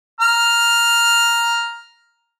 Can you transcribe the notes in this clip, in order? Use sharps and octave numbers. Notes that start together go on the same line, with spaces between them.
A#5 F6